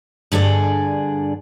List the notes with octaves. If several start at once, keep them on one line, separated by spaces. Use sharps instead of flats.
G2 D3 G#4 D5